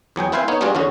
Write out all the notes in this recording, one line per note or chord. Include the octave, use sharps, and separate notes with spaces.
E2 F#3 G#4 G5
C4 E4 B4 C5 F5 G#5
B3 D#4 C#5
G3 B3 D4 F4 F#4 G#4
E2 D3 C#4 F#4